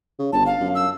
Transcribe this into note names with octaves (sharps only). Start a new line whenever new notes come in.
C#3
G1 A5
F5
F#2
E6